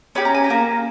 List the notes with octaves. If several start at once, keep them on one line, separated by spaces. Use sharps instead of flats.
C#4 G4 B5
A#5
G#5
A#5
A#3